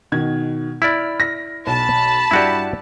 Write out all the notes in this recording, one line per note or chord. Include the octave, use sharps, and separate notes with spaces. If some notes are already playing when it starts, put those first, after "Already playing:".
B2 D#3 G#6
E4 D5 B5 F6
A#6
B1 A5 B5
G2 E4 F#4 G4 D5